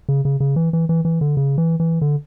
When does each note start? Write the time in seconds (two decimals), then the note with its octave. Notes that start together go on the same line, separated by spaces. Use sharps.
0.09 C#3
0.25 C#3
0.40 C#3
0.56 E3
0.73 E3
0.89 E3
1.05 E3
1.21 D3
1.37 C#3
1.58 E3
1.80 E3
2.01 D3